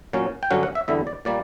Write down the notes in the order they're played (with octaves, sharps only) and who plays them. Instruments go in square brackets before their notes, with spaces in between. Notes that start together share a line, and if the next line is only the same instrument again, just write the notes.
[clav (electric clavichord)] A#2 F#3 C#4
G5
G2 D3 F#3 C#4 F#5
F#5
E5
E2 D3 G3 E5
D5
A#2 G3 A#3 D5